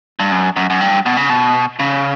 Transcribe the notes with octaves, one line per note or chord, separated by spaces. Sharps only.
G2
F#2
F#2
F#2
G2
B2
C#3
B2
C#3